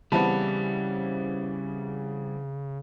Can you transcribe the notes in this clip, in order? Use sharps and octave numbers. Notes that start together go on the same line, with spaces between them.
C#3 E3 G3 B3 C4 A5 B5